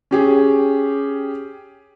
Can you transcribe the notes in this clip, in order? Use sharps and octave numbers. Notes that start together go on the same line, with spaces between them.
C#4 G4 G#4